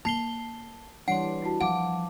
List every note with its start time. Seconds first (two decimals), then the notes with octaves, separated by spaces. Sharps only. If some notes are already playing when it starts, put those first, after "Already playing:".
0.05 A#3 A5 C7 G7
1.08 E3 G3 D4 C#5 F#5 C6 C7
1.42 E4 F#4 A5
1.61 F3 F5 F#5 A5 D6